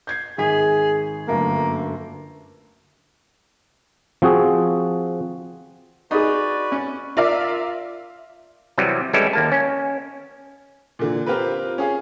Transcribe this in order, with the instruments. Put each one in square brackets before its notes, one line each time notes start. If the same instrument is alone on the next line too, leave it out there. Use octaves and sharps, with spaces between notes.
[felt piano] G6 G#6 C7
[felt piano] G#1 B6 [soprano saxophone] G#4
[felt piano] G1 F#2 A3 [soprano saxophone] A#3
[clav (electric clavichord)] F3 C4 F#4 G#4
[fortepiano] D#4 G#4 [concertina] F#4 B4 D5
[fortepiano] C#4
[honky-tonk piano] F4 A#4 D5 E5 F5
[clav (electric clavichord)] C3 E3 F#3 G3
E3 G3 G#3 C#4 E4 A4
D#2 A#3 A5
C#4
[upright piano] A#2 D3 E3
C4 F4 G4 A#4 B4
C#4 G#4 F5